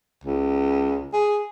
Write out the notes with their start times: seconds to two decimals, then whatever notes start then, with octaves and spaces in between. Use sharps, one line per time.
0.24 C#2
1.13 G#4